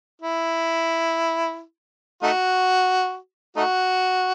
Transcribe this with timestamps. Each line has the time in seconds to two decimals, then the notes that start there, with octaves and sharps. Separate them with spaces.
0.21 E4
2.23 A3 D#4 F#4
3.56 A3 D#4 F#4